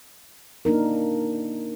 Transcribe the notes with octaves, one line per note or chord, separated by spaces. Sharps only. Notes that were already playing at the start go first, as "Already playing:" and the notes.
A#3 D4 D#4 A#4